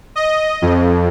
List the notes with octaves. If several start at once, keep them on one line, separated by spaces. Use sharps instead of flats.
D#5
F2